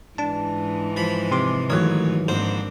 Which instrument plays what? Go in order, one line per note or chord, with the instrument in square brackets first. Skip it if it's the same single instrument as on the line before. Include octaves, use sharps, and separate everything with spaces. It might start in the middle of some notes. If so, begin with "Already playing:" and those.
[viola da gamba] G#2 E3 G#3 [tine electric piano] D4 A5
[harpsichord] F3 B5
[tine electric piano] C3 C6 D6
[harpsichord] A1 C#5 [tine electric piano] D#3 F#3
[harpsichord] A#1 G#2 C5 [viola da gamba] C4 D4